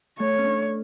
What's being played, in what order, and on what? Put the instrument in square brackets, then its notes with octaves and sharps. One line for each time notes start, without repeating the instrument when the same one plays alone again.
[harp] A3 [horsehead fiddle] C#5
[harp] C#4
D4